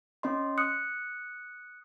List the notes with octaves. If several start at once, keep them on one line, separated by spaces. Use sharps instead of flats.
C#4 D#5 C6
D#6 F#6 C#7